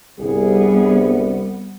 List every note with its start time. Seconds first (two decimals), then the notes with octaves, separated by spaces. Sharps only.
0.19 G1 C2 G3 B3 G#4